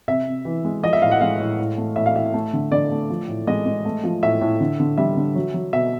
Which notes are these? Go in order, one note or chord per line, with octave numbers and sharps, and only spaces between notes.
C3 E5
C3
E3
G#3
F3 D#5
E5
A2 F5
F#5
G#3 F5
A2
A2
A3
A2 E5
F5
A2 E5
A3
D3
D3 D5
A3
F3
A2
G#3 D#5
G#3
A3
F3
A2 E5
A2
D3
D3
G3 E5
D3
F#3
F#3
B2 E5